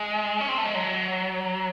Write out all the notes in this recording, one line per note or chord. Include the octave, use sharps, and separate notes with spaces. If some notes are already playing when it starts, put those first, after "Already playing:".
Already playing: G#3
C#4
C4
A3
G#3
F#3